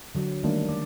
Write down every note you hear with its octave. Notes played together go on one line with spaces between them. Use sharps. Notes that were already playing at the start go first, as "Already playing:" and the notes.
D3 F#3
D#3 G3 A3 A#3 D4
D5